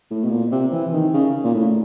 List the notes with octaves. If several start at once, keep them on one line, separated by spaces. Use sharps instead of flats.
A2
B2
A#2
C3
E3
D#3
C#3
A#2
A2